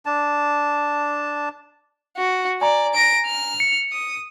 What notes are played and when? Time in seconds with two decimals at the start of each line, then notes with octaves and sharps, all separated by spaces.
0.06 D4 A5
2.17 F#4
2.61 D5 G#5 A#5
2.94 A#6 D7
3.26 F6
3.60 C#7
3.92 D#6